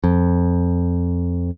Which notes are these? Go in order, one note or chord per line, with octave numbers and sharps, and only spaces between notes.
F2